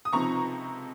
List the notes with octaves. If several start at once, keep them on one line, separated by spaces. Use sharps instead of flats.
D#6
C#2 C3 F3 C4 D#4 A#5 C#6